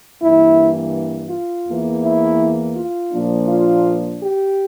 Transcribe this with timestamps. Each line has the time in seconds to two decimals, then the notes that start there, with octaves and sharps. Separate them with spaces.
0.21 G2 E3 A#3 E4
1.30 F4
1.67 E2 E3 A#3
2.03 E4
2.75 F4
3.12 A#2 F3 A#3 D4
3.48 F4
4.21 G4